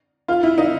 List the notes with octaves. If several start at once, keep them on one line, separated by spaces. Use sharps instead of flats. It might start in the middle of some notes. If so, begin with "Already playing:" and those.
F4
E4
D#4